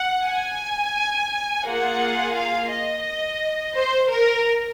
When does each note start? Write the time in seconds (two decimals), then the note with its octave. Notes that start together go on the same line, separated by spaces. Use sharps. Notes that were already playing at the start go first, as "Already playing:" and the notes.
Already playing: F#5
0.26 G#5
1.65 A#3 F4 G#4 F#5
2.36 F5
2.71 D#5
3.76 C5
4.11 A#4